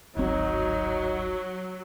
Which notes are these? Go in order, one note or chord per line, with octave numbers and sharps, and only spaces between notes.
D1 G#1 F#3 C4 D#4